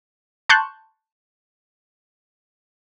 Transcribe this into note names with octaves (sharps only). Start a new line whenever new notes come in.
A5 C6 C#6 F#6 G6